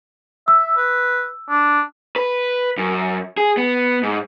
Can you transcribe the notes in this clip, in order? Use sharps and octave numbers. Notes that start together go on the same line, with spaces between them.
E5 E6
B4
D4
B4
F#2
G#4
B3
G#2